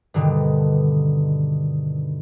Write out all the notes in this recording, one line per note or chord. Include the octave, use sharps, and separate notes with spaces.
G2 B2 D3 D#3